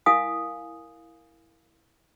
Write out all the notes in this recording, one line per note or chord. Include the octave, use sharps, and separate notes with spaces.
E4 A#4 F5 G#5 D#6